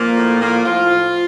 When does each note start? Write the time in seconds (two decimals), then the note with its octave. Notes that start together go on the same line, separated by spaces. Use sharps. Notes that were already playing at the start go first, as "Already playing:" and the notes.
Already playing: A#2 F3 A#3
0.16 A2
0.40 A#2 F3 A#3
0.65 A2 F3 F4
0.90 F3